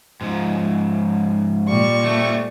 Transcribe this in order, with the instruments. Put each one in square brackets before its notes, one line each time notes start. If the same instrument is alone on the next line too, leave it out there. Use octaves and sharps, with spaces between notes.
[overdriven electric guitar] G#2 F3
[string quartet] A#2 G3 C#6
[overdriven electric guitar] A3 C4